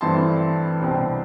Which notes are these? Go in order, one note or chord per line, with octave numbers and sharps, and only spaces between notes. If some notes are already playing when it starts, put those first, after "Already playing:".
G2 E3 A3 C4 A5 C6
C2 B2 G3 C4